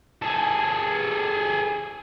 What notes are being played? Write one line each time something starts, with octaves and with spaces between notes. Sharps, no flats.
G#4 A4